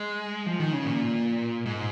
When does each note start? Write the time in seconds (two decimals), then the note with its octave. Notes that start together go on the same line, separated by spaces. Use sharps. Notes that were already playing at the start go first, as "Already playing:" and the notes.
Already playing: G#3
0.46 F3
0.60 D#3
0.73 C#3
0.86 A#2
1.66 G#2